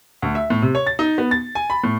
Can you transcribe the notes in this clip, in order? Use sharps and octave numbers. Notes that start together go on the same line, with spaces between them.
D2
E5
A2
C3
C#5
A6
D#4
B3
A6
G#5
B5
A2